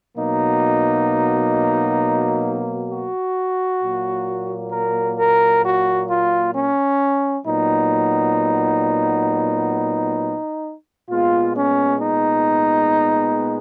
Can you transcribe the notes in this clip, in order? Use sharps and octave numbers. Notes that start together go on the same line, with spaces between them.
B2 F#3 A#3 D#4
F#4
A#2 F#3 A#3
A#4
A#4
F#4
F4
C#4
A#2 F#3 B3 D#4
A#2 G#3 B3 F4
C#4
D#4